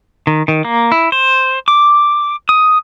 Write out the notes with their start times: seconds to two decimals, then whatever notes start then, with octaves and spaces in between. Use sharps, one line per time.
0.27 D#3
0.48 D#3
0.65 A#3
0.92 E4
1.12 C5
1.68 D6
2.49 D#6